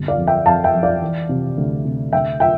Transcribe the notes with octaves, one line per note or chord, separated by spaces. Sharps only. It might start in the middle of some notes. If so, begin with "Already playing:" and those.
Already playing: G1 C2
D5 F5
F2
E5 G5
F2 F5 A5
E5 G5
F2
D5 F5
E3
C3
D2
C3
D2 E5 G5
E5 G5